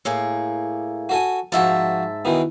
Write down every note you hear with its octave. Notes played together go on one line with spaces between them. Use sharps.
A2 A#3 G#4
F#4 A4 G#5
G#2 F3 F#4 E5 A5
B2 D#3 E3